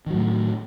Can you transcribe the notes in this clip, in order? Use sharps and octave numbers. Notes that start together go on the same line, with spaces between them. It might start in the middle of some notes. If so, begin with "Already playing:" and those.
A2 D#3 F#3